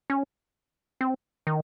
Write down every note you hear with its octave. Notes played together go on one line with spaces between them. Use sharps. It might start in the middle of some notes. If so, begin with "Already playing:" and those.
C#4
C4
D#3